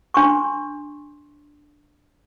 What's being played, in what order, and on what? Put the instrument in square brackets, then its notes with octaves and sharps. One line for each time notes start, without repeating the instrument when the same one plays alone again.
[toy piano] D4 C6 C#6